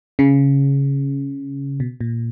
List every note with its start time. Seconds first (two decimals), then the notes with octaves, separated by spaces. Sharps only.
0.19 C#3
1.80 B2
2.01 A#2